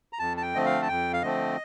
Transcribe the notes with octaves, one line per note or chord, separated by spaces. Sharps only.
A#5
F2 A5
A5
G5
D3 F3 A3 C4 D#5
F5
A5
F2 G5
F5
D3 F3 A3 C4 D#5